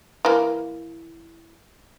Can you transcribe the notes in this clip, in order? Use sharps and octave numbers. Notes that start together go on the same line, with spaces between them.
E3 A#3